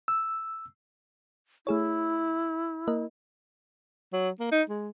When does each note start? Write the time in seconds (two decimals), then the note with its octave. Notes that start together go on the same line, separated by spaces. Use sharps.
0.08 E6
1.67 A3 E4 G#4 C#5
2.88 A#3 A#4 D#5
4.13 F#3
4.40 A#3
4.52 D#4
4.70 G#3